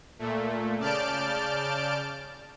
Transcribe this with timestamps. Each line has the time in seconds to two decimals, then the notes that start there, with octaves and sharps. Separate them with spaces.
0.19 A#2 A3
0.79 C#3 D5 A5 F6 G6 D7